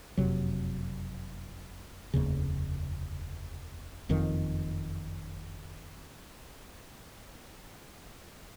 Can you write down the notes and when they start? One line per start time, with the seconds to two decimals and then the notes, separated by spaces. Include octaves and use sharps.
0.17 F#1 F2 C3 F#3
2.14 F1 D#2 C#3
4.09 F#1 F2 D#3